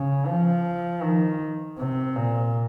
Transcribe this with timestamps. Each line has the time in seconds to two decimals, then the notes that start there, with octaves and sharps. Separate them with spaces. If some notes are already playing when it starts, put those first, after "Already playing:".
Already playing: C#3
0.27 F3
1.02 D#3
1.78 C3
2.16 A#2